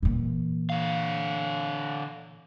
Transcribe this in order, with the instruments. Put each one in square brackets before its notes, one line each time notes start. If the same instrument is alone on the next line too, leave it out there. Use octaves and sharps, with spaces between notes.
[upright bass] A#2 E3
[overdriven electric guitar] D3 F5